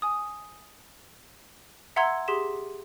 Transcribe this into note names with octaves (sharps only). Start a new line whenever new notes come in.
G#5 D#6
E5 F#5 A#5 C6 E6 G#6
G4 G#4 C6 B6 E7